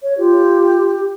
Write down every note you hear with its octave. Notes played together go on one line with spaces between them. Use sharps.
C#5
F4 G4